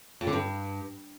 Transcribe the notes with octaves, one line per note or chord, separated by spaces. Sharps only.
F2
D3
G2